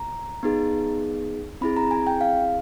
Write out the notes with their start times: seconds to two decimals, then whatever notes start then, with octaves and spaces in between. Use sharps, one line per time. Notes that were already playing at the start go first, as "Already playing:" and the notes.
Already playing: A#5
0.43 B3 D#4 G#4
1.61 C4 E4 G#4 B5
1.77 A#5
1.91 G#5
2.07 G5
2.21 F5